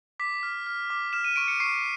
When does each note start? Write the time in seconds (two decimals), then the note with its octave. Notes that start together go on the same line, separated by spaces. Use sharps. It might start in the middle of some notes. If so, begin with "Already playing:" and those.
0.20 D6 B6
0.43 F6
0.67 F6
0.90 D6
1.13 F6 E7
1.24 D#7
1.36 C#6 D7
1.48 C#7
1.60 C#6 C7